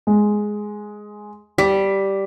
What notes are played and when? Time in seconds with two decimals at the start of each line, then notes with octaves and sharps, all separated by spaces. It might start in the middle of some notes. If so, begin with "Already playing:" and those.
0.07 G#3
1.58 G3 B6